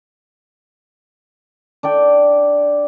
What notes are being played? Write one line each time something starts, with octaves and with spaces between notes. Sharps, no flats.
D4 D5 G5